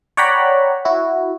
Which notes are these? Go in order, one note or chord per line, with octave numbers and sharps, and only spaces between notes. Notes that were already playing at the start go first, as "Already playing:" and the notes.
C#5 D5 F#5 G5 A#5 B5
E4 F#4